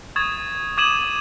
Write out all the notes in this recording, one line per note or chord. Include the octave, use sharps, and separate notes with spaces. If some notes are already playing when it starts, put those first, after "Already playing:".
C#6 D#6 G#6 A6 E7
D6 D#6 G#6 D#7 E7 F#7